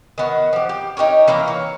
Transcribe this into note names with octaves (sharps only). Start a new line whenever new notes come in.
D#3 B3 F#4
F3 G4
G4
D#4 G4 A#4 C#5
E3 A#3 F5 A#5
C#5